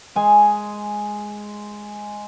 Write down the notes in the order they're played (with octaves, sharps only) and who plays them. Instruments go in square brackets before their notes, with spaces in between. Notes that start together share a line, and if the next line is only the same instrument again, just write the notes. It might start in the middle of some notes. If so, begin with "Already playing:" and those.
[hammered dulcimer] G#3 G#5